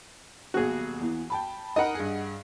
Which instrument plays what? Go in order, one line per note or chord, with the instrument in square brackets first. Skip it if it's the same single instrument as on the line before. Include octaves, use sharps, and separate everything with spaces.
[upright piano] D#1 B1 [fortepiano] F#4 G#4
[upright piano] E2 E3
G5 A5 B5
[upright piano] D#4 A#4 B5 [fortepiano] D#5 F#5
[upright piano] G2 G#4